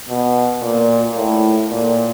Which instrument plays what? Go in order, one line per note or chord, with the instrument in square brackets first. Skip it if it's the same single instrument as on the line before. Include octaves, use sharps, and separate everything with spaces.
[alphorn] B2
A#2
A2
A#2